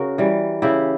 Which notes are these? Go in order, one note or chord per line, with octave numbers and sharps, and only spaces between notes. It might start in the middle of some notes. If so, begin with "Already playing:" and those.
Already playing: C#3 F#4 A#4
E3 G3
C#3 E4 G4